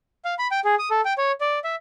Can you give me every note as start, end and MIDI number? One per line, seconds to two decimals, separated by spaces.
0.25 0.34 77
0.39 0.47 83
0.51 0.60 79
0.65 0.75 68
0.79 0.89 87
0.91 1.01 69
1.05 1.13 79
1.18 1.32 73
1.41 1.59 74
1.64 1.75 76